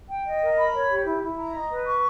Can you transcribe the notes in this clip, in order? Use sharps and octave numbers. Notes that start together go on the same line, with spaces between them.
G5
D#5
A#4
B5
C#5
G4
E4
E4
A#5
D#5
B4
C#6